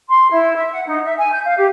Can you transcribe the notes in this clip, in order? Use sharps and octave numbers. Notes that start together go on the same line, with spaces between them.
C6
E4
E5
F#5
D#4
E5
G#5
G6
F5
G4